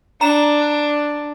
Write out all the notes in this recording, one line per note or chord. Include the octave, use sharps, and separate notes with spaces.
D4 A#5 E7